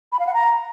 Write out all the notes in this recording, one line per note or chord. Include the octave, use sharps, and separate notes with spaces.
B5
F5
F#5
A#5